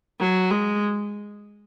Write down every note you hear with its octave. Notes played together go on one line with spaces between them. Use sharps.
F#3
G#3